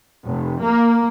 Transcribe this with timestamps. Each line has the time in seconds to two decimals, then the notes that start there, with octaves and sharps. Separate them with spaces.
0.24 F1
0.61 A#3